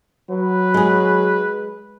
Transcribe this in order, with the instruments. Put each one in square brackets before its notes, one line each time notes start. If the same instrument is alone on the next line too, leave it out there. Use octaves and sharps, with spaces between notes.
[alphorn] F#3 [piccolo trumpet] B4
[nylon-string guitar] G#3 G#4